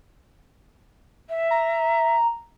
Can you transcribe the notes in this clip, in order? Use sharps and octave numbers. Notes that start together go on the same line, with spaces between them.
E5
A#5